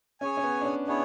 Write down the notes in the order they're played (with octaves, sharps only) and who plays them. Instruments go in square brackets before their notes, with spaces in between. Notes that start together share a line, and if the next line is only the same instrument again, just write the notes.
[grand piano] C#4 [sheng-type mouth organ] G#4 C#5 G#5
[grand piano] C#4
B3
D4
C#4
[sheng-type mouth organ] B3 E4 G#4 C#5 [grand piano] D4